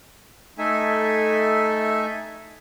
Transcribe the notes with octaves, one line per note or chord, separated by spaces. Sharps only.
A3 D#4 A4 E5 G#5